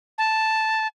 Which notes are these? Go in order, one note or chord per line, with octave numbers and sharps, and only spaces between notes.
A5